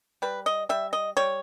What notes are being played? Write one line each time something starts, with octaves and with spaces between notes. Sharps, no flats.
G3 B4
D#5
G3 E5
D#5
G3 C#5